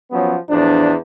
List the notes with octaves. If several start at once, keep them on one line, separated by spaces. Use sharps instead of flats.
F3 F#3 B3 C#4 F#4
E2 A2 F3 D4